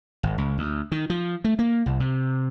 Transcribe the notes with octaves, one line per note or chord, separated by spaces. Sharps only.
G#1
C#2
D2
D#3
F3
A3
A#3
C2
C3